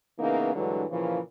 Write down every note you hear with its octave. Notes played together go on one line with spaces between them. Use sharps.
C#3 E3 A#3 B3 D#4
G2 D3 E3 F#3 G#3
A#2 C#3 E3 F3